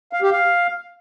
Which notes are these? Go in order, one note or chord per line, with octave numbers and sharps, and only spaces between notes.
F5
G4
F5